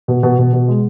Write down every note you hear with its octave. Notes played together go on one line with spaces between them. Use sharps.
B2
B2
B2
B2
G#3